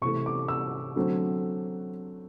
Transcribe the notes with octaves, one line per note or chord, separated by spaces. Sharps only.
C3 E3 A3 C#6
D6
E6
D3 F#3 A3 C4